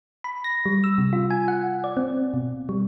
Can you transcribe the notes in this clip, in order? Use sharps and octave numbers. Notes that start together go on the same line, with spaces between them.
B5
A#6
G3
E6
C3
F4
G#5
F#5
D5
C4
B2
G3